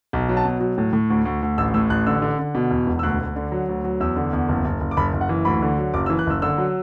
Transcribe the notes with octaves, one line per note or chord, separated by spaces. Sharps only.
B1
F#3
A5
B2
F#3
A2
A2
D2
D2
D2
A1 E6
A2 E6
A1 F#6
D3 E6
D3
D3
B2
E2
E1
E6
D2 F#6
D2
D3
F#3
D2
F#3
E2 E6
D3
E2
F#1
F#1
F#1
D6
F#1 B5
F#1
F#5
E3
D2 B5
D3
F#3
F#1 D6
E6
E3
F#6
F#1 E6
D3 E6
F#3